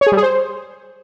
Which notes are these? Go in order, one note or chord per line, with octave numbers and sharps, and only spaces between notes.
C#5
G#4
G3
G#4
C5